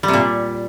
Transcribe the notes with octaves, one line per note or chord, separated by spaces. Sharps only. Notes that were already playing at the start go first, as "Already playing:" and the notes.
G3
C3
A#2